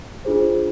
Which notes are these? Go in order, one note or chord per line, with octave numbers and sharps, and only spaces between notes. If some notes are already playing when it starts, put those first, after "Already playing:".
D4 F4 G#4 C5